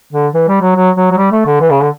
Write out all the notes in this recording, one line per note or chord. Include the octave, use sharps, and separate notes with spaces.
D3
E3
G3
F#3
F#3
F#3
F#3
G3
A3
D3
E3
C#3
D3